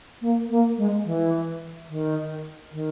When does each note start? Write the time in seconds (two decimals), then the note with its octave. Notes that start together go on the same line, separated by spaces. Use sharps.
0.22 A#3
0.50 A#3
0.78 G#3
1.05 E3
1.89 D#3
2.72 D#3